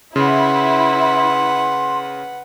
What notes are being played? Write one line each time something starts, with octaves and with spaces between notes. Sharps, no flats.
C#3 E4 B4 F#5 C6